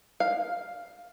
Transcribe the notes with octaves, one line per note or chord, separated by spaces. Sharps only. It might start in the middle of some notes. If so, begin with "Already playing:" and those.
F5